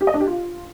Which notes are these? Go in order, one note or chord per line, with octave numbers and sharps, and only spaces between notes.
G4
D#5
D4
G4
F4